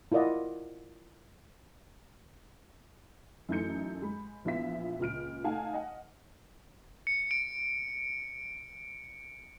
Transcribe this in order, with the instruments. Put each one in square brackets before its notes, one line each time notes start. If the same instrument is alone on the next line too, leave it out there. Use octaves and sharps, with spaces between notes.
[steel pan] E4 F4 A#4 D5 D#5 F#5
[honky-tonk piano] F#2 E3 A3 D#4 G6 C#7
G#3 B5
A#1 E3 B3 F4 E5 B6
C#2 A#2 F6 D7
A3 D#4 F5 F#5 G#5 A5
D#5 F#5
[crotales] C#7
D7